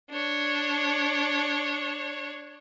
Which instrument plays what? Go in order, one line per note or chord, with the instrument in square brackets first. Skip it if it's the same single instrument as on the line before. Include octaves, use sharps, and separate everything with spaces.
[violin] D4 C#5